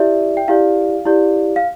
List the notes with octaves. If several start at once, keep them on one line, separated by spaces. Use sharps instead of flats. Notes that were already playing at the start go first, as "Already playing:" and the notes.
Already playing: E4 G4 D5 E5
G5
E4 G4 D5 F5
E4 G4 D5
F5